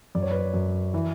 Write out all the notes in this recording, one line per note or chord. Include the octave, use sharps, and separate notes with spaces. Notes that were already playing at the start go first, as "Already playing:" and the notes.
F#2 D5
C#5
B4
C#5
F#2
E3